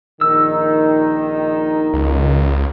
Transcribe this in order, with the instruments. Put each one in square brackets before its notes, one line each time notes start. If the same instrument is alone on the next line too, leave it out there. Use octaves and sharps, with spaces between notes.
[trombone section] A#1 D#3 [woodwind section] D#4 [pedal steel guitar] E6
[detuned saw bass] C#2